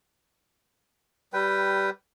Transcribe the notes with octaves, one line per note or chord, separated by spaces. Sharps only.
G3 B4 G5